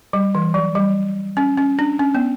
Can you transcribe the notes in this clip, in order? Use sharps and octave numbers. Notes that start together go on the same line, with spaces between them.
G3
E3
F#3
G3
C#4
C#4
D4
C#4
B3